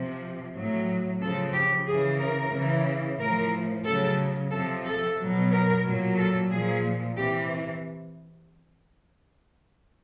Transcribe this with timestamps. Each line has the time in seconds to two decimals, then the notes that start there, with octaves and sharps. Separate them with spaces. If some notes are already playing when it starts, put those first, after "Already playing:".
Already playing: C3 F3
0.54 A2 F#3
1.21 C#3 F3 A4
1.53 G4
1.87 C#3 E3 G#4
2.19 A#4
2.53 C#3 E3
3.19 A2 F3 A#4
3.85 C#3 F#3 A4
4.51 C3 F3 A4
4.85 A4
5.17 B2 F#3
5.51 A#4
5.84 A#2 F#3
6.17 A4
6.50 A#2 F3 G#4
7.16 C3 E3 G4